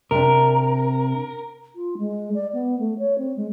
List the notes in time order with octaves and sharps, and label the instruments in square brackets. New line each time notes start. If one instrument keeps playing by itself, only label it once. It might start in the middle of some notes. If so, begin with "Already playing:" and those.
[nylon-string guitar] C3 D4 [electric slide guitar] A#4
[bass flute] F4
G#3
D5
B3
A3
C#5
C4
G#3